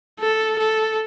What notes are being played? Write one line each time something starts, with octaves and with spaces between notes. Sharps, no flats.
A4
A4